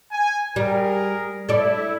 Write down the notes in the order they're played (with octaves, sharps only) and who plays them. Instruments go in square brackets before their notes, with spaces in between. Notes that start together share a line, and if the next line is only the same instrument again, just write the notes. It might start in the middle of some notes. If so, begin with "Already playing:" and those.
[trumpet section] G#5
[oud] G3 [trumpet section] G#4 A#4
[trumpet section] E4 [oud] A4 D5